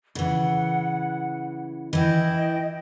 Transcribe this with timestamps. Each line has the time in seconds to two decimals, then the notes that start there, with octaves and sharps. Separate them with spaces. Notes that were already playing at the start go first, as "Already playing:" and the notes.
0.15 C#3 E3 F#5
1.93 E3 E4 D#5 G5